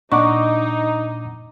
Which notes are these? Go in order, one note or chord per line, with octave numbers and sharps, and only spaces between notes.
A#2 D4 D#4 D#5 F#5 A#5 C#6 D6